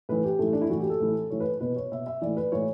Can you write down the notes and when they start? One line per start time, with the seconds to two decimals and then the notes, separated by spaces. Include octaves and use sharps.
0.09 A2 E3 B4
0.24 G4
0.39 A2 E3 A3
0.53 D4
0.62 E4
0.70 A2 E3 F#4
0.80 G4
0.90 A4
1.00 A2 E3
1.31 A2 E3 C#5
1.40 B4
1.60 B2 B4
1.76 C#5
1.92 B2 E5
2.07 E5
2.21 A2 E3 D5
2.37 B4
2.52 A2 E3 C#5